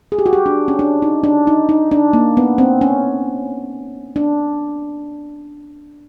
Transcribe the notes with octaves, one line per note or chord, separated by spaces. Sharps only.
G#4
G4
F#4
G4
D4
C#4
D4
D#4
D4
D#4
D#4
D4
A#3
B3
C4
C#4
D4